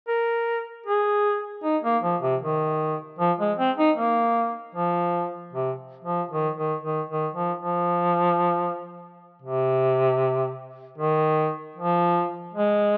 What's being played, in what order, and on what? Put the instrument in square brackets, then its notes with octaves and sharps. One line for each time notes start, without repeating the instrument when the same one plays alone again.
[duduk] A#4
G#4
D#4
A#3
F3
C3
D#3
F3
G#3
C4
D#4
A#3
F3
C3
F3
D#3
D#3
D#3
D#3
F3
F3
C3
D#3
F3
G#3